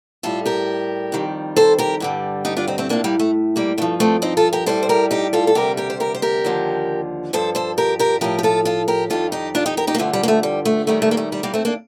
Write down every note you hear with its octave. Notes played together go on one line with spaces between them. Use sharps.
A2 G3 F4 A4
G4 A#4
F2 D#3 G3
A4 C5
G4 A#4
G2 D3 G3
D#4 G4
D4 F4
C4 D#4
A3 C4
A2 F3 A#3 D4
G3 A#3
A3
G3 A#3
G2 F3 A3
A3 C4
C4 D#4
F4 A4
G4 A#4
A2 G3 A4 C5
C5
G4 A#4
D#4 G4
F4 A4
A4
D2 C3 G3 G4 A#4
G4 A#4
C5
G4 A#4
C5
G4 A#4
D#2 D3 F3
G2 F3 A4 C5
A4 C5
G4 A#4
G4 A#4
A2 F3 G4 A#4
G4
F4 A4
F4 A4
G4 A#4
F2 D#3 G3 F4 A4
D#4 G4
D4 F4
D#4 G4
G4 A#4
D#4 G4
A#3
G2 D3 F3 A3
G3
A#3
A3
G3
A3
D#2 D#3 G3 A3
A3
A#3
A3
G3
G3 A#3
A3 C4
A#3 D4